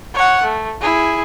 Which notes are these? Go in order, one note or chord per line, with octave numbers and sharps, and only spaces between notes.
C#5 F#5
A3
E4 G#4